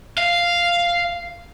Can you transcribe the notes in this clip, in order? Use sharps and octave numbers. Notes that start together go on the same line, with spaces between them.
F5